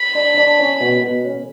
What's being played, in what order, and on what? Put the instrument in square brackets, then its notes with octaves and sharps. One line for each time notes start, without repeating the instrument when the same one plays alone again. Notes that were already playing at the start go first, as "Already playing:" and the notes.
Already playing: [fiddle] B5
[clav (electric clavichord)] D4
D4
C#4
B2
B2
C#4